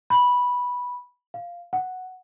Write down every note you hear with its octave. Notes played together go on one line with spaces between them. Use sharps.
B5
F5
F#5